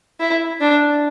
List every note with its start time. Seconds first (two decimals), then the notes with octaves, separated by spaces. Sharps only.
0.20 E4
0.60 D4